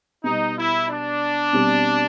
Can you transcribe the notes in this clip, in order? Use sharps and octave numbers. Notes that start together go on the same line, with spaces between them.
B2 G3 B3 D#4
E4
D4
B2 G3 C4